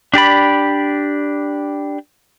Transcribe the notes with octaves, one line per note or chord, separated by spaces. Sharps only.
D4 G4 D5 B5